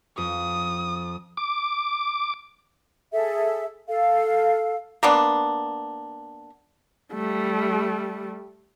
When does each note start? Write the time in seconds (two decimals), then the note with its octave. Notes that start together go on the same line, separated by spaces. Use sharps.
0.18 F2 D#6
1.37 D6
3.13 G#4 A4 E5
3.88 A4 F5
5.03 A#3 B3 D4
7.13 G3 A3